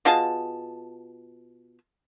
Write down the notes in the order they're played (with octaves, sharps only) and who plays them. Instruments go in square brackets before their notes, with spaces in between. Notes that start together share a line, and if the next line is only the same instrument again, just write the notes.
[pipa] B2 F4 G#4 A5